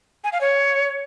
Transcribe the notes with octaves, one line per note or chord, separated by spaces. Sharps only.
G#5
F5
C#5